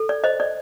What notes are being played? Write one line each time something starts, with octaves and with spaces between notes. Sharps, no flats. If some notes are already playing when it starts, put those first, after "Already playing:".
Already playing: A4
D5
C5 D#5
D5